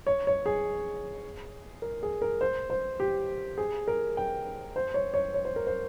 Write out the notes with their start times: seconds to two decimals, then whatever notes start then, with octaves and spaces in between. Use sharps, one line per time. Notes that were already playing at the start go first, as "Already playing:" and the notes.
0.07 C#5
0.27 C#5
0.46 G#4
1.82 A#4
2.03 G#4
2.22 A#4
2.41 C5
2.70 C5
3.00 G4
3.58 G#4
3.88 A#4
4.17 G5
4.76 C5
4.94 C#5
5.14 C#5
5.34 C#5
5.45 C5
5.56 A#4
5.67 C5